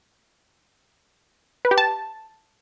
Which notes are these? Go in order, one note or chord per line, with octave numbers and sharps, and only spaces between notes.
B4
G4
A5